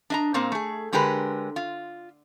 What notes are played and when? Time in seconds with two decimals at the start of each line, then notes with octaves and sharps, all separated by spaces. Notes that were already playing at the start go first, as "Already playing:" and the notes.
0.10 D4 D#5 A#5
0.34 A#2 A#3 C4
0.52 A3 G#4
0.93 D3 G#3 G4 A#4 B4
1.56 F4